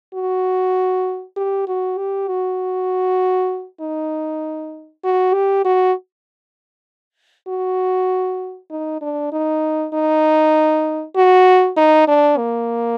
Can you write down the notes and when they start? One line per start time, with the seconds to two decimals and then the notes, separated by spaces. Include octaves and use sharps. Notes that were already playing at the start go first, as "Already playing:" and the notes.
0.14 F#4
1.36 G4
1.68 F#4
1.98 G4
2.28 F#4
3.81 D#4
5.04 F#4
5.34 G4
5.65 F#4
7.48 F#4
8.70 D#4
9.02 D4
9.32 D#4
9.93 D#4
11.16 F#4
11.77 D#4
12.08 D4
12.38 A#3